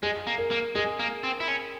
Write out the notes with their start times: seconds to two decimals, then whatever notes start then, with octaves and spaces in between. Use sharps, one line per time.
0.03 G#3 G#4
0.27 A#3
0.38 A#4
0.51 A#3
0.75 G#3 G#4
0.99 A#3
1.23 C4
1.40 E4
1.48 C#4